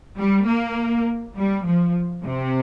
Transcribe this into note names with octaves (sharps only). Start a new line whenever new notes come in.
G3
A#3
G3
F3
C3